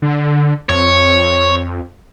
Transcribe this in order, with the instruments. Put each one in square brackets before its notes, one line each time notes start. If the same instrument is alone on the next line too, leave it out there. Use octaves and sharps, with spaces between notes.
[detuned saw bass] D3
[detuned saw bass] F2 [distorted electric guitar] C#5